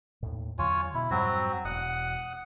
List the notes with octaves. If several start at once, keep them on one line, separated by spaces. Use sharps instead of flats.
D#2 A2
E2 D3 F#3 F4 C#5 G#5
B2 E4
F2 G#2 F#3 G3 C4 F#4
E1 F#5 D#6